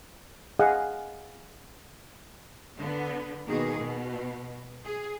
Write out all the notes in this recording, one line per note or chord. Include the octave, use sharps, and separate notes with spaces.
G#4 D#5 F5 F#5
D3 B3
B2 D#3 A#3 G#4
B2
G#4